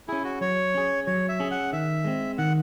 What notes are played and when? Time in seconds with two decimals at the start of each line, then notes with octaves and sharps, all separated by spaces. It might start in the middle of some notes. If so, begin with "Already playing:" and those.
0.08 C#4 E4 G#4
0.24 F#4
0.41 F#3 C#5
0.74 C#4 G#4
1.07 F#3 C#5
1.29 E5
1.40 C#4 G#4
1.51 F#5
1.73 D#3 E5
2.05 G#3 C4
2.38 D#3 F#5